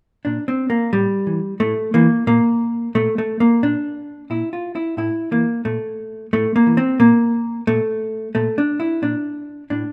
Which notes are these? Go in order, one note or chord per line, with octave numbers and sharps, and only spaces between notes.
A#2 D4
C4
A#3
A2 G3
E3
A2 A3
E3 A#3
A#2 A#3
A#2 A3
A3
A#3
A#2 D4
A#2 E4
F4
E4
A2 E4
E3 A#3
A#2 A3
A2 A3
A#3
E3
C4
A#2 A#3
A#2 A3
A#2 A3
D4
E4
A#2 D4
A2 D4